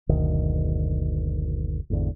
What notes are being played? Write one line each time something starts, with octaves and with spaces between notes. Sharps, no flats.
F#1 D2 B2 D#3
G#1 E2 D3